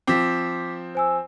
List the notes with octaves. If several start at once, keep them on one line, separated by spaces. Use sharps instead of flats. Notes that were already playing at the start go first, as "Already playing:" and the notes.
F3 C4 D6 B6
C5 G#5 E6